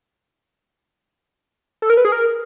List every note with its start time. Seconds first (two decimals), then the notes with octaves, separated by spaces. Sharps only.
1.82 A4
1.90 A#4
1.97 B4
2.05 G#4
2.12 A#4